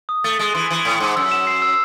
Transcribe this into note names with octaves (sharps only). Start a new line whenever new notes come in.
D#6
A3 A6
G#3 A6
E3 C6
E3 F#7
A2 F#7
G#2 C6
F#2 E6
E7
C7
E6